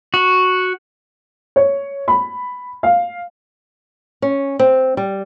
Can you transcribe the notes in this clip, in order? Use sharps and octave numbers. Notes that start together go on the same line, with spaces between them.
F#4
C#5
B5
F5
C#4
C4
G3